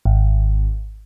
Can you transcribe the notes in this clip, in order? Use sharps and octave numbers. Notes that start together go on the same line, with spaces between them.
G#1